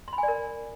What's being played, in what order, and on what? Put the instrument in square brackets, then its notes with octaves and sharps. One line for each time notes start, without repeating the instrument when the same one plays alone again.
[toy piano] C6
B5
G#5
D5
A#4